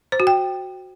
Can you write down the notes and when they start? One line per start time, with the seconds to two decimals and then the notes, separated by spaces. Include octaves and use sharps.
0.12 C5
0.20 F#4
0.27 G5